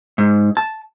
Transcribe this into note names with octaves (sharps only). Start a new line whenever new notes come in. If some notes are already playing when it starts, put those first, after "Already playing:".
G#2
A5